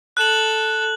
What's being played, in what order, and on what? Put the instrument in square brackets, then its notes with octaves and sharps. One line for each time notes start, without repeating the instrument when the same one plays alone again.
[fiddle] A4 [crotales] F#6 F#7